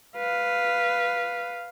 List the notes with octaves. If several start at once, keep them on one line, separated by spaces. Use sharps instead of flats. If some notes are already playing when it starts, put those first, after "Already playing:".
B4 F5